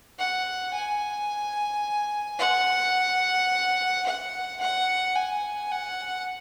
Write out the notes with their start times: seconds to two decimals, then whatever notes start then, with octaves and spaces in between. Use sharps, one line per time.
0.19 F#5
0.74 G#5
2.39 F#5
4.06 F#5
4.61 F#5
5.15 G#5
5.72 F#5